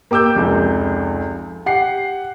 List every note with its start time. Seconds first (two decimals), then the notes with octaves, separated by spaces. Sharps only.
0.11 A#3 G4 D6 E6 G6
0.36 F1 C#2
1.66 G4 F#5 C7